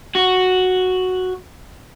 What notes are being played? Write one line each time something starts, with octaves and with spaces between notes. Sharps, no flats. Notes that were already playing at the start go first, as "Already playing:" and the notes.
F#4